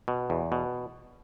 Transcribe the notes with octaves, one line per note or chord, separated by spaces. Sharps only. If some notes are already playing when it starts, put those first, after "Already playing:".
B2
E2
B2